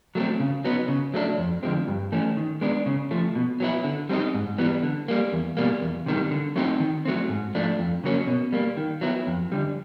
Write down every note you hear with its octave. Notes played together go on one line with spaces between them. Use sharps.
F#3 A3 C4
C#3
F#3 B3 D#4
C#3
F#3 A3 D4
F2
D3 F3 G#3 C4
G2
E3 A3 C#4
D#3
G#3 B3 D4
C#3
F3 A3
B2
F#3 B3 E4
D3
G3 C4 D#4
G#2
E3 G3 B3
D3
G3 A#3
E2
B2 G3 A#3
E2
C3 D#3 G3
D3
F#3 A3 C4 D#4
D#3
F#3 A3 C4
G#2
F3 A3 D4
F2
C#3 F#3 A#3 C#4
B2
G3 A#3
D#3
F#3 B3 E4
F2
D3 G3